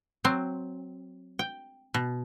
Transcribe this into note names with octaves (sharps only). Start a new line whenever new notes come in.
F#3 C4
G5
B2